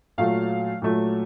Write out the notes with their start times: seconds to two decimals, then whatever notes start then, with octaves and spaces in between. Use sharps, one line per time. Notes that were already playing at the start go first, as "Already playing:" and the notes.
0.18 A#2 F#3 A3 F5
0.82 A#2 F#3 A3